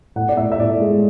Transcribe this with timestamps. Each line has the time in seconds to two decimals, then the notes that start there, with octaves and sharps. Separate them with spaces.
0.16 A2 F#5
0.29 D5
0.37 A2 E5
0.52 E5
0.59 A2 D5
0.81 G#3